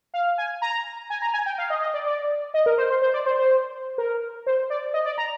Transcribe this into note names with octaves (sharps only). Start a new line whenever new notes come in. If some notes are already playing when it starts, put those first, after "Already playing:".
F5
G#5
A#5
G#5
A#5
G#5
G5
F5
D#5
D#5
D5
D5
D#5
A#4
C5
C5
C5
D5
C5
C5
A#4
C5
D5
D#5
D5
A#5